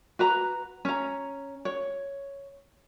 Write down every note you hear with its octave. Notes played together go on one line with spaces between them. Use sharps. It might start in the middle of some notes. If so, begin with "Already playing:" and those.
F#4 B4 A#5
C#4 A#5
C#5